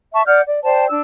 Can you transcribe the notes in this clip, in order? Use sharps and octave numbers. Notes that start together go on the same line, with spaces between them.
E5 A5 C#6
D5 F#5 F6 G6
D5
C5 D5 G5 A5
D4 E6